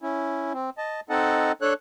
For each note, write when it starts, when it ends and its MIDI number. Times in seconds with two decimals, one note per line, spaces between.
0.02 0.53 61
0.02 0.53 64
0.53 0.70 60
0.78 1.01 75
0.78 1.01 81
1.10 1.52 60
1.10 1.52 63
1.10 1.52 69
1.10 1.52 75
1.10 1.52 78
1.10 1.52 81
1.62 1.74 62
1.62 1.74 69
1.62 1.74 73
1.62 1.74 90